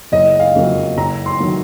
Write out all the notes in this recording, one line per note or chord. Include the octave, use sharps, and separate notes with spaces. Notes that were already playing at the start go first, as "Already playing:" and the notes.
F#1 D#5
F5
F2 C#3 F#3 A#3
F#1 A#5
C6
D#3 F#3